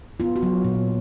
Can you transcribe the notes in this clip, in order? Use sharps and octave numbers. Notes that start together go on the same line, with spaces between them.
B3 F4
F#4
F#3
A#2